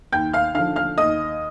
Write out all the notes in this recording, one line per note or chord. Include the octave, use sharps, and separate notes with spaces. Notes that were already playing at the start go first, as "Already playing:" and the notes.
D#2 G5 G6
F5 F6
D3 F3 F5 F6
F5 F6
D#2 D#5 D#6